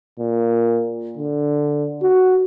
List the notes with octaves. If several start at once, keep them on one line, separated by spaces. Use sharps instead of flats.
A#2
D3
F#4